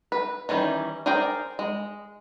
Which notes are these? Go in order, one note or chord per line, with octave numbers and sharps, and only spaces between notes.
B4
D#3 E3 G3 C#4
G#4 A#4 C5 D5 G5
G#3